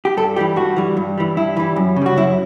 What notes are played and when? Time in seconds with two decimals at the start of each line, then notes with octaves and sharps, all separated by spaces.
0.05 G4
0.17 G2 A4
0.36 E3 G3 G4
0.56 G2 F#4
0.76 E3 G3
0.97 G2
1.18 E3 G3
1.37 G2 E4
1.57 E3 G3
1.76 F#2
1.96 C#3
2.02 G3 F#4
2.16 F#2 E4